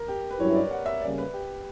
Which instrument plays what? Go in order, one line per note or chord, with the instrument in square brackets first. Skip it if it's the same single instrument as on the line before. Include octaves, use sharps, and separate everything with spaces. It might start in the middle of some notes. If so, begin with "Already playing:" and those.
Already playing: [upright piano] A#4
G4
B4
[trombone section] G2 F#3 C#4 E4 [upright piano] C#5
[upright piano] D5
F#5
E5
[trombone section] C#3 G3 A#3 C#4 [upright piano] D5
[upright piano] B4
G4